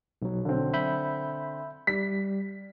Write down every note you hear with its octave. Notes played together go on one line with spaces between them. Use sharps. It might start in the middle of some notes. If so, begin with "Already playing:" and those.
B1 F#3
D3 C4
E5 B5 G6
G3 B6